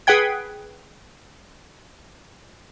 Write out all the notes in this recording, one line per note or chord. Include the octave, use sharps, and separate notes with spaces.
G#4 B4 F#5 G5 G#6